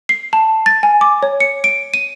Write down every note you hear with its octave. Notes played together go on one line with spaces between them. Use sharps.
C7
A5
A6
G#5
D6
C#5
C#7
D7
D#7